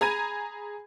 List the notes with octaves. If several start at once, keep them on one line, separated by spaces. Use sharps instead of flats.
G#4 A#5 B5 G#6 D#7